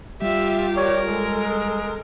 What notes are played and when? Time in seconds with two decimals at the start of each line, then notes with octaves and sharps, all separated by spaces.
0.22 G3 F4 G4 E5
0.76 A#4 C#5 D5
1.07 G#3 A4